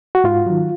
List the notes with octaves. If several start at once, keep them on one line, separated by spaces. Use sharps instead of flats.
F#4
G#2 F4
D#3 F#3